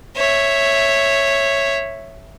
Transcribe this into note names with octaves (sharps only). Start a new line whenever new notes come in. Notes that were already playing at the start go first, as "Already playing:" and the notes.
C#5 E5